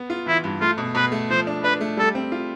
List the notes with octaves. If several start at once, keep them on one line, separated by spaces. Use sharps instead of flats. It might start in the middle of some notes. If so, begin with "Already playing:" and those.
Already playing: B3
F4
E3 E4
G2
A3 F4
B2
B2 B4
A3
F3 C5
D4
D4 B4
A3
G3 A4
C4
F4